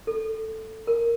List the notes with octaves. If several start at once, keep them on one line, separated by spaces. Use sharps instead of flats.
A4
A#4